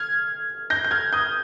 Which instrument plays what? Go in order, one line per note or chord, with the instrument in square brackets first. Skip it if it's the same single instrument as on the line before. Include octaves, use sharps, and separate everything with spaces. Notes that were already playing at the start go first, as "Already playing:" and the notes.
Already playing: [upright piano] F6 G#6
G6 A#6
G6
F6 G#6
D#6 G6